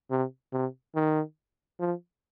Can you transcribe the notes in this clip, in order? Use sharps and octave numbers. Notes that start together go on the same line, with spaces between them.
C3
C3
D#3
F3